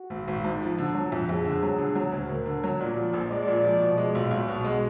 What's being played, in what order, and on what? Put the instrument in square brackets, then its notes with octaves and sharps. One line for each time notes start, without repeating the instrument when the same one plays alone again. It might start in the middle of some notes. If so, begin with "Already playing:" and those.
Already playing: [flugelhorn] F#4
[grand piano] G#1
G#1
G#2
F3
D3
F#3
F2
[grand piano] F2 [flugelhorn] G#4
[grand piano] D3
F#3
D3
F#3
D2
[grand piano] D2 [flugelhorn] A#4
[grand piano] D3
F#3
[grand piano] A#2 [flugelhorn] D5
[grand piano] F3
A#1
[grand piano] G#3 [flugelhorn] D5
[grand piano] A#2
F3
B2
G#3
B1
[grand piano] B1 [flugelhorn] F#4
[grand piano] B2
G#3